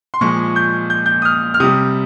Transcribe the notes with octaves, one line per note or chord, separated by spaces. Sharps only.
C6
A#2 F3 G#3 C#6
G6
G6
G6
D#6
F6
F6
C3 G3 D#6